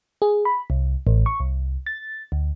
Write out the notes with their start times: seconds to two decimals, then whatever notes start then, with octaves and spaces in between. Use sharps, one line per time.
0.22 G#4
0.45 B5
0.70 C2
1.07 A1
1.26 C#6
1.40 C2
1.86 A6
2.32 D2